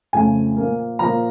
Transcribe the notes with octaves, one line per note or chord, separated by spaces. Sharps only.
F2 C#3 F3 A3 G#5
A#2 F3 A#3
A#2 F3 A#3 A#5